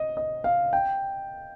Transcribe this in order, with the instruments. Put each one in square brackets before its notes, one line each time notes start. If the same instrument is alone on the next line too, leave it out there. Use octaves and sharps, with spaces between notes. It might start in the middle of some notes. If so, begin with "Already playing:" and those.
Already playing: [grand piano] D#5
D#5
F5
G5